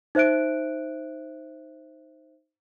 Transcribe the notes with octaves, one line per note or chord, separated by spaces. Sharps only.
D#4 C5 E5 F#6 D7